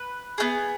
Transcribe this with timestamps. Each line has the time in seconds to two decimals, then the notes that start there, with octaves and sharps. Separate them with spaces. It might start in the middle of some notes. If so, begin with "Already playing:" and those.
Already playing: B4
0.38 B3 D#4 G#4